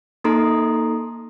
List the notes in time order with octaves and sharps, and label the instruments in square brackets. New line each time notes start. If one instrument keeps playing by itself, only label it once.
[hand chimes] A#3 D#4 A4 A#5 C6 D#6